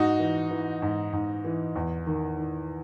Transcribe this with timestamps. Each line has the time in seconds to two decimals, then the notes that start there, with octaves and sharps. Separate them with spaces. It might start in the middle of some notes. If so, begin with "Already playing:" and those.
Already playing: G#2 D#4 F#4
0.19 E3
0.51 E3
0.82 G#2
1.13 G#2
1.45 E3
1.76 E2
2.07 D#3
2.38 D#3